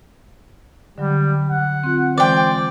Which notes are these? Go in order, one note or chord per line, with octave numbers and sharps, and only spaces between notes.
D3 F#3 G3
F#5
C4 F4
E3 G#3 C5 D5 G5